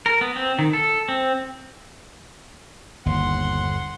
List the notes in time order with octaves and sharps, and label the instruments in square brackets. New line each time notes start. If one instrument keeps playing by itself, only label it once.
[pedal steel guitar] A#4
B3
C4
D#3
A4
C4
[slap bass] G1 [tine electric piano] D#2 [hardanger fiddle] F#5 C6